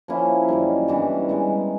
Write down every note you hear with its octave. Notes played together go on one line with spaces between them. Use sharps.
F3 A#3 C#4 E4
F#2 D#3 G3
G2 E3 G3 B3
G#3 B3 D#4